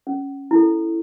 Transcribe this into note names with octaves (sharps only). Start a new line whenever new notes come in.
C#4
E4 A4